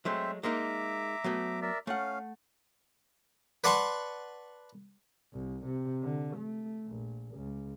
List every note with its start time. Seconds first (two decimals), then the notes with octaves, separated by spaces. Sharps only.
0.05 F#3 G#3 A3 C4 C5 E5
0.43 G#3 A#3 D#4 E5 A#5 D6
1.24 F#3 A3 B3
1.62 A#4 D5 E5
1.87 A3 C#4 F5 F#5
3.64 B4 D5 F#5 A5 C6 C#6
5.34 C2
5.66 C3
6.03 D3
6.37 A3
6.88 A#1
7.35 C#2